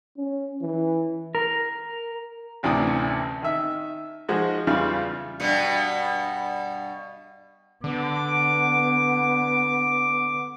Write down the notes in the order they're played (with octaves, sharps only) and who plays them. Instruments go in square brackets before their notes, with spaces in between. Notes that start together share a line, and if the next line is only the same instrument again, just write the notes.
[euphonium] C#4
E3
[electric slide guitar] A#4
[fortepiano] A1 D2 C3 E3 D5 D#6
D#3 E5
F3 G#3 D#4 F#4
E2 C#3 G3 F4
[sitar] G2 B2 B3
[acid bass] D3 [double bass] B3 [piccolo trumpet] D6